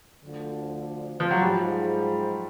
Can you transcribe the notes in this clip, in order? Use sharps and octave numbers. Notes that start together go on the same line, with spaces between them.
D2 D3 F3
F3
F#3
G#2 F3 G3 G#3